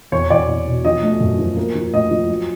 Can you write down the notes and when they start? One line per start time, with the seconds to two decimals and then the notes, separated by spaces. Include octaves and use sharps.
0.12 E2 C#5
0.30 E2 D5
0.48 E2
0.67 B2
0.85 F3 D#5
1.03 A3
1.21 F#2
1.39 F3
1.56 A#3
1.75 F3
1.93 A2 D#5
2.11 F3
2.29 F#3